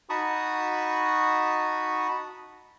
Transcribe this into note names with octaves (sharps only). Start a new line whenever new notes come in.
D#4 F#4 A5 B5 C#6 D#6